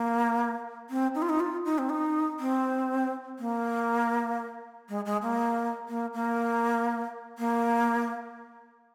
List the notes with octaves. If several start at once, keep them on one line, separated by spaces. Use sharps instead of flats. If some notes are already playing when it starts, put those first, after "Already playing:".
Already playing: A#3
C4
D#4
F4
D#4
F4
D#4
C4
D#4
C4
A#3
G#3
G#3
A#3
A#3
A#3
A#3